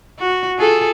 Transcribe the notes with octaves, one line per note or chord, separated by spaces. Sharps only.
F#4
F4 G#4 A4